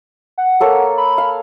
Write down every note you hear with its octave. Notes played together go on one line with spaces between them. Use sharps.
F#5
A#3 A4 C#5
B5
F5